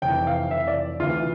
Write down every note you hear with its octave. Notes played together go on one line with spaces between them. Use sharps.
F1 F2 E3 G5
F5
F1 F2 E3 E5
D5
D2 C3 E3 F4